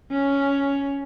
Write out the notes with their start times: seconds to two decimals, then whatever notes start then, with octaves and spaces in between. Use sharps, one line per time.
0.11 C#4